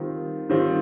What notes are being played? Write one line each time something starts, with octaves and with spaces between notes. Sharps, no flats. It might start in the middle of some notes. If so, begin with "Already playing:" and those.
Already playing: D#3 G3 C4 F4
D#3 G3 C4 F4